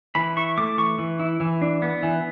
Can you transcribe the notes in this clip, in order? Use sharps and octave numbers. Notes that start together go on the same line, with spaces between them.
E3 B5
E4 C#6
A3 D6
E3 C#6
E3
E4
E3
D4
B3
E3